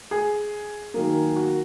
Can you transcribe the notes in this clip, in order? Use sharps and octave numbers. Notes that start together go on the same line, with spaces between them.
G#4
D#3 F#3 A#3
F#4